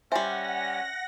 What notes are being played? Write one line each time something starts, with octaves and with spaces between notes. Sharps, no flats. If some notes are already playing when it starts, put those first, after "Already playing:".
G3 C#4 C5 E5 F#5 G#5 A#6